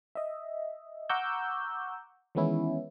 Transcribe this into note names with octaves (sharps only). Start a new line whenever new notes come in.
D#5 E5
F#5 A#5 C#6 D6 E6 G6
D#3 E3 G#3 B3 C#4 E4